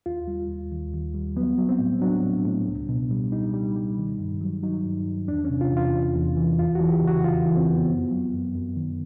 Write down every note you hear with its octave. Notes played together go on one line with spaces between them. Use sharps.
D#2 F4
G3
D#2
D#2
D#2
G3
F#3 B3
F#3
C4
A2
F#3 D4
A2
A2
C#2
B2
G3
G3 D#4
G3
G3
D#3
G2
F#3
F#3 D#4
G2
G2
E2 D4
C3 C#4
F4
E2
F4
E2
E2
E3
F2 F4
F#4
E3
G4
C#3
F#4
F2 F4
E3
C4
F2
B3
F#2
F#3
F#2
F#2
D#3